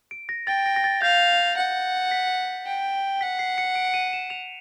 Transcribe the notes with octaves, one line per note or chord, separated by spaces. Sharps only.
D7
A#6
G5 A6
A#6
A#6
A6
F5 G6
F#5
B6
G5
F#5 B6
C7
C#7
D7
D#7
E7
F7